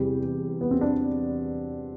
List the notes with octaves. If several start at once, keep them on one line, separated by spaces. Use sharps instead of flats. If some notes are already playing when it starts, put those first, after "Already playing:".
Already playing: E2 C3 G3 G4
B3
C4
D4